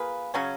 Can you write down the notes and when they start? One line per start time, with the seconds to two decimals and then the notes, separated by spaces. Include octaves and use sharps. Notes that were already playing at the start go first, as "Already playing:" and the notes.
Already playing: A#3 F4 G#4 B4
0.34 C#3 F#3 C#4